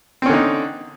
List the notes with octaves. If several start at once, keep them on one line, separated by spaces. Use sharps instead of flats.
D3 C4 C#4 D#4